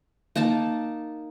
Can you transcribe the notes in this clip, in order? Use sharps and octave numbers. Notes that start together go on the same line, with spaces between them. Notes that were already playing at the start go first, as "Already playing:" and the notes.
A#3 D#4 A5 D6